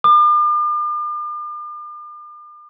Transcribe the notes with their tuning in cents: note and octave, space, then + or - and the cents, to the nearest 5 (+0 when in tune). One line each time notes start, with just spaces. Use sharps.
D6 +45